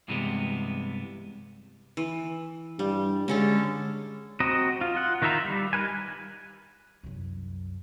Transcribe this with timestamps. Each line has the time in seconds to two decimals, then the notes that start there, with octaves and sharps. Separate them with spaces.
0.08 G2 C3 E3 G3 G#3 B3
1.97 E3
2.79 G2 G3
3.28 D3 G#3 C#4 A4
4.40 C4 F#4 D#5 A#5
4.81 F4
4.95 F4 F#5
5.22 D#3 D#4 F4 E5 A#5
5.45 G3
5.73 D#4 A#4 B4 G#5
7.03 C2 F#2